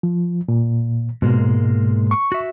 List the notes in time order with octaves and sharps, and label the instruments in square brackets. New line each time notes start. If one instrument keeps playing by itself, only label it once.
[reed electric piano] F3
A#2
[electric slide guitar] G#2 G#3 A#3 [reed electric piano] B2
[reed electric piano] C#6
[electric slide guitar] F#4 E5